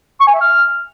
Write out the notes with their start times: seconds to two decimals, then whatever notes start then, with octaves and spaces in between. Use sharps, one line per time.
0.20 C#6
0.27 G#5
0.34 E5
0.41 F6